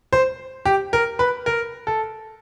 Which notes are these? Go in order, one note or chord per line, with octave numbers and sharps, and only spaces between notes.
C5
G4
A#4
B4
A#4
A4